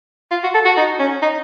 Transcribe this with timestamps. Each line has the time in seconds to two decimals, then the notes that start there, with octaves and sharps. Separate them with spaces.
0.31 F4
0.43 F#4
0.54 A4
0.65 F#4
0.77 D#4
0.99 C#4
1.22 D#4